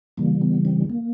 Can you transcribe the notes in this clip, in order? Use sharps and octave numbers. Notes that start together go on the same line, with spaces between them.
C#3 E3 G3 A#3
B3
C4
A#3